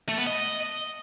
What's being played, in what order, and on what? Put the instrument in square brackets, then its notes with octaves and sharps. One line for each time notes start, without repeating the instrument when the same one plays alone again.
[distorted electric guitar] A3
B3
D#5